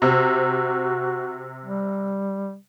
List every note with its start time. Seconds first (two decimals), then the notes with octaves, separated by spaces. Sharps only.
0.02 C3 F#4
1.66 G3